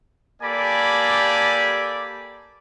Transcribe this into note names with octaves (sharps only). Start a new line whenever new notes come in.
A#3 G4 A4 D5 G#5 B5